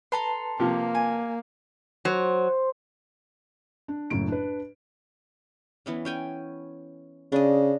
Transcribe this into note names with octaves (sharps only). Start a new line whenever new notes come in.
A4 B4 A5 A#5 C6
C3 F3 A#3
G#5
F#3 C5
D4
F#1 F#2 A2 D7
D4 B4
E3 B3 C#4
C#4 G5 G#5
C#3 D4 D#5